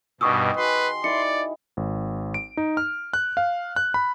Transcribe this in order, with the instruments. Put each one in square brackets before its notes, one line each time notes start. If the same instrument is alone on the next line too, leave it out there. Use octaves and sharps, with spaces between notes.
[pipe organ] G2 B2 [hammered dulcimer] D#3 G4 G#5 [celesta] C#6 D#6 E6
[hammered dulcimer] F#4 G#4 [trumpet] B4 [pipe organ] C6
[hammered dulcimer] D#3 E4 [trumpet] D5 [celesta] C#7
[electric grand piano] G#1
D7
D#4
F6
F#6
F5
F#6
B5